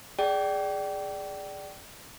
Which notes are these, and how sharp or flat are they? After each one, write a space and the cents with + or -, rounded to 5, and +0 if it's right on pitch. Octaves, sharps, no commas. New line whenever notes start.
G#4 +0 D5 +0 G5 -25